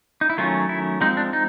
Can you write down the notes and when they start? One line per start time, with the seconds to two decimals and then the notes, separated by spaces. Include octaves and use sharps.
0.21 D#4
0.30 E4
0.38 D#3 F#3 A3 C#4 F4
0.69 E4
1.01 F3 G#3 C4 D#4
1.17 D4
1.33 D#4